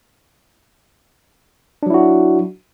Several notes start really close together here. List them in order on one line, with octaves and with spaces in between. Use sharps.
D4 F#3 E4 F#4